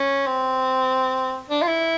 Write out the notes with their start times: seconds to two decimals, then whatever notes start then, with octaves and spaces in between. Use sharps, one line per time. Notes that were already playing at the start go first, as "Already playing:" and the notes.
Already playing: C#4
0.26 C4
1.50 D4
1.62 F4
1.67 E4